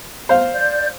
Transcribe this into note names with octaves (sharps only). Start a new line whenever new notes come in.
C5 F5
D5 G6